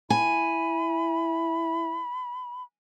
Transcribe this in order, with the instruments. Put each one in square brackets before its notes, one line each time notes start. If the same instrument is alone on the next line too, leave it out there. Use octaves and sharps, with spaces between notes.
[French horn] E4 [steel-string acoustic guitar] G#5 [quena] B5